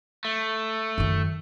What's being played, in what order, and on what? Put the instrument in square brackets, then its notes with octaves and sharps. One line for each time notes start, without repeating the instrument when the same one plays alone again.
[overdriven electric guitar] A3
[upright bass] F#2 D#3